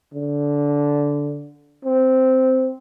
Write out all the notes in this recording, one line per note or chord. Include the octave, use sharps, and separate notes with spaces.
D3
C4